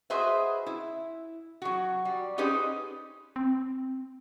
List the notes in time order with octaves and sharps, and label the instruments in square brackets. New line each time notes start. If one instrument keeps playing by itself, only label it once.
[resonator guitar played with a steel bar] F#4 G#4 B4 C5 D#5 E5
E4
F#3 F#4
G3
C#4 D#4 G4 G#4 B4 C5
[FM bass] C4